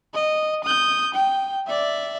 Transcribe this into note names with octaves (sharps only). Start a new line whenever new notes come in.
D#5
D#6 G6
G5
D5 E5